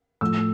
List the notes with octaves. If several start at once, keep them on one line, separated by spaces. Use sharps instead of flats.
A2 F3 A3 E6